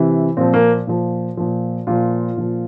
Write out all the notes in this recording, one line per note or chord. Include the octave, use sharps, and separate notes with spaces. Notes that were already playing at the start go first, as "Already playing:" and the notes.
Already playing: C3 E3
A#2 F3 C4
A#3
A#2 F3
A#2 F3
A#2 F3 F4
A#2 F3